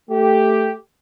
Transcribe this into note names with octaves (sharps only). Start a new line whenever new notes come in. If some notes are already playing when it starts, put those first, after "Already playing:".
A3 G4